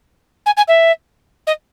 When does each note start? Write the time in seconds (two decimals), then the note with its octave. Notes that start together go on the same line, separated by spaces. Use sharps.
0.46 G#5
0.57 G#5
0.68 E5
1.47 D#5